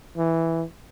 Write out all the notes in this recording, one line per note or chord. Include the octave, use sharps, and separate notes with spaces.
E3